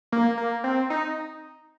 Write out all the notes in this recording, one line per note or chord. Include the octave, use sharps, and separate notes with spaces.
A#3
A#3
C4
D#4